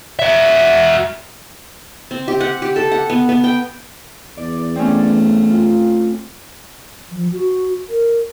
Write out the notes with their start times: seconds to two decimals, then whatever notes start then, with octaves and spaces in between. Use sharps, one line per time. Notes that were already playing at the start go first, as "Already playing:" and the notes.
0.19 F#4 E5
2.11 C4
2.28 G4
2.41 F#5
2.62 G4
2.76 A4
2.92 F#5
3.10 B3
3.29 B3
3.44 G5
4.37 E2 D5
4.75 A3 C4 C#4
5.50 F4
7.11 F3
7.32 F#4
7.89 A#4